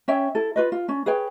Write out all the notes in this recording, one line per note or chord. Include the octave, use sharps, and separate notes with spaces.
C#4 C#5 E5 G5
E4 A4
F4 B4 D#5
F4
C#4 D4
G#4 B4 C#5 G5